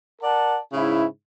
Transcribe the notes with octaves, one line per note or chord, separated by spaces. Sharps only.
A#4 D5 F#5 A5
G#2 C#3 E4